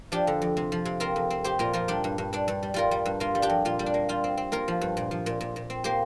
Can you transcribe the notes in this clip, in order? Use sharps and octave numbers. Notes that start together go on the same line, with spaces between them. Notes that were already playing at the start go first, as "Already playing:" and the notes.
F3 D4 G4
D3
F2
C3
F3
C3
C4 F4 A#4
F2
C4
C4 G4 C5
A#2 F4 A#4
F3 F4 A#4
G3 D4 G4
G2
G2
G2 D4
G2
G3
G3 F4 A#4
G3
G2
A#3 F4
G3
D4 G4
F2
A#2 F4
G3
D4
A#3
G3 F4
C4
C4
A#3 F4 A#4
F3
G2
A#2
F3
A#2
A#2
A#2
C4
A#3 G4 C5